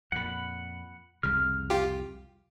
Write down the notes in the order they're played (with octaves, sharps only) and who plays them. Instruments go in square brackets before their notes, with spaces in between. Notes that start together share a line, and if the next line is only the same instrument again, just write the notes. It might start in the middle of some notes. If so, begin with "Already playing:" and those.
[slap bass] F2 A#2 [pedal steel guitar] F#5 B5
[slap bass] C2 F2 C#3 [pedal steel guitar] F6
[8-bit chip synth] F4 G4